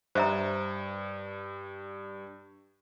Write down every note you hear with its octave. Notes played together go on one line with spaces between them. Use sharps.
G2 C5 E5 A#5